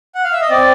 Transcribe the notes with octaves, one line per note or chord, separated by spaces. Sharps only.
F#5
F5
E5
D#5
C4 D5